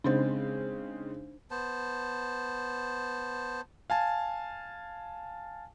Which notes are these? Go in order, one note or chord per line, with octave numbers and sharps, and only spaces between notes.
C#3 G#3 C4 D4 D#4 C5
B3 C5 A5
F5 G#5 A5